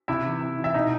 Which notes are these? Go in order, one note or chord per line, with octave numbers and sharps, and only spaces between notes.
C3 E4 E5
E3
C3
E3
E5
B2 D#4 D#5